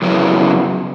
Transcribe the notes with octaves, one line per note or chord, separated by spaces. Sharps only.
F#2 C#3 F#3 B3 E4